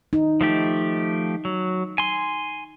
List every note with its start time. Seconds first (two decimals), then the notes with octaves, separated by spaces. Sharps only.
0.13 D#4
0.41 F3 A3 G4
1.45 F#3
1.98 G#5 C6